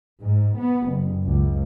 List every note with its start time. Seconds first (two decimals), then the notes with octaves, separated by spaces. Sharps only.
0.22 G#2
0.56 B3
0.87 F#1
1.25 C#2